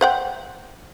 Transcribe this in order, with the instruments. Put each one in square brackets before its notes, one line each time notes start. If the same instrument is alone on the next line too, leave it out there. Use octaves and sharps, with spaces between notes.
[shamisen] C5 F#5 G5